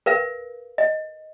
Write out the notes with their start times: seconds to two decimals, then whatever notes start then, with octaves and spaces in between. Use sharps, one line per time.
0.06 A#4 B4 F5
0.78 D#5